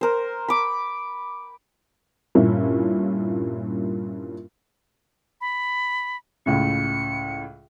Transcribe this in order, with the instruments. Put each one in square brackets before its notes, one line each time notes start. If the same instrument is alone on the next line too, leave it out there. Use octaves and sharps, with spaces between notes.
[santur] A#4 C5
B5 D6
[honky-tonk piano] G2 A#2 A#3 C#4 E4
[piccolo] B5
[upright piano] C#2 A2 C#3 [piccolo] C#7